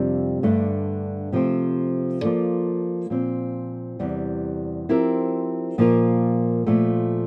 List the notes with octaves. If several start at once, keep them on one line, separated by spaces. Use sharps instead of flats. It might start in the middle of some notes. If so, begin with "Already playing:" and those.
Already playing: F2 C3 G3 D4 F4
G2 D3 A3 D4
C3 F3 A3 C4
F3 A#3 F4 A4 D5
A#2 F3 C4
E2 C3 G3
F3 C4 E4 G4 A#4
A#2 F3 A#3 F4 A#4
A#2 F3 A3